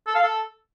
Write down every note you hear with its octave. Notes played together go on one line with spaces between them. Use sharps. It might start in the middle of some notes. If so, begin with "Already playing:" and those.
A4
F5
A4